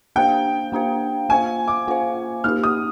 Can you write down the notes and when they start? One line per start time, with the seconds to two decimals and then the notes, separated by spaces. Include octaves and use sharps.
0.16 A#3 D4 G4 C5 F5 G5
0.72 A#3 D4 G4 C5 F5
1.29 A#3 F4 C5 F5 G#5
1.68 D6
1.88 A#3 F4 C5 F5
2.44 A#3 D#4 G4 F6
2.64 D#6